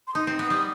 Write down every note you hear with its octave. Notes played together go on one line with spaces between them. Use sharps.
C6
D#4 D#6
C4
B3 D#6
G3 D#6